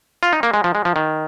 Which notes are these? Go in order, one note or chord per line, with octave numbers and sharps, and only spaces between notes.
F4
D#4
A#3
G#3
F3
G#3
F3
D#3